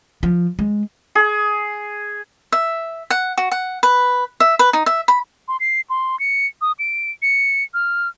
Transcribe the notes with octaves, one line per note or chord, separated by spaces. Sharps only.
F3
G#3
G#4
E5
F#5
F#4
F#5
B4
E5
B4
D#4
E5
B5
C6
C7
C6
C#7
D#6
D7
C#7
F6